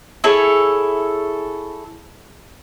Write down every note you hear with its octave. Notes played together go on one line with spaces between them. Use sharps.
E4 G#4 A4 C#5